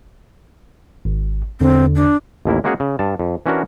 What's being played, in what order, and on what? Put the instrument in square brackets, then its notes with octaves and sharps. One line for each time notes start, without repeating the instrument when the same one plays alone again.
[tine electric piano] G#1
[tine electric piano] E2 D3 [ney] C4
[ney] D4
[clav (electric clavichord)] A1 D#2 A#3 E4
G#3 A#3 C#4 F#4 G#4 C#5
C#3
G2 A5
F2
E3 C#4 D4 F#4 A#4